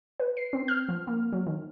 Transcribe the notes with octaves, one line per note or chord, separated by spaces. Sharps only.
B4
C7
C4
F6
F3
A#3
F#3
D#3